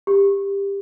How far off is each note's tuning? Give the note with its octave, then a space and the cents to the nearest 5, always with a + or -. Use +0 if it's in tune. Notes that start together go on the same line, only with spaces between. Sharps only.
G4 +20